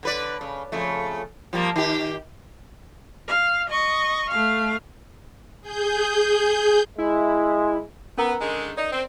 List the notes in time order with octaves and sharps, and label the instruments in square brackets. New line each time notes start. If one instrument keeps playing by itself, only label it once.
[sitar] D3 B4 D5
C#3
F2 C#3 A3
F3 G3 A#3
D#3 G4
[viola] F5
D#5 C#6
A3 F5
[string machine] G#4 G6
[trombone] G#3 [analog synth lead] E4
[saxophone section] B3 [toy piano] C#4 A#4 A#5
[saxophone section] D3 D#3 G#3
[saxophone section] D#4 [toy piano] D5
[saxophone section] C4